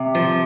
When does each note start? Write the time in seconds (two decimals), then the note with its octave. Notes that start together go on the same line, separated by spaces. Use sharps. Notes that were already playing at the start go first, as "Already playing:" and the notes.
Already playing: C3
0.15 F3